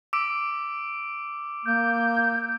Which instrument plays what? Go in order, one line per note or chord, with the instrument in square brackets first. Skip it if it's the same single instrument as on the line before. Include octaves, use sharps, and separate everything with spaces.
[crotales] D6 E6 D7
[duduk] A#3 [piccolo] G6